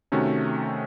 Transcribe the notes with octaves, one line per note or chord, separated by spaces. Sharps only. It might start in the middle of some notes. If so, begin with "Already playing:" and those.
C3 D#3 A3 C#4 F#4